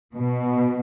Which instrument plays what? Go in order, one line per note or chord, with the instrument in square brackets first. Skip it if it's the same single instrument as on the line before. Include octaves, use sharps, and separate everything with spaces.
[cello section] B2